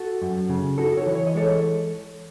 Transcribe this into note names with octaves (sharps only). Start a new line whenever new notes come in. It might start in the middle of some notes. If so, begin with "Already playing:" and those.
Already playing: F#4 A4
F#2
C#3
D#4 F#4 A4
A4 C#5
E3
C#5
D#5
G#3 A4 C#5